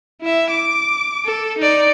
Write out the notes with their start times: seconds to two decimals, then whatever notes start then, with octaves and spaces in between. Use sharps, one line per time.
0.21 E4 E5
0.50 D6
1.25 A4
1.58 D#4 D5